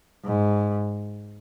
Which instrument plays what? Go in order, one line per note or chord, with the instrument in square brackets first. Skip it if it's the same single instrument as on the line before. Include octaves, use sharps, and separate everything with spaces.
[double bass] G#2